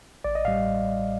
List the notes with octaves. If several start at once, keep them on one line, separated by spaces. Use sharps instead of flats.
A1 D5
D#5
A2 G3 F5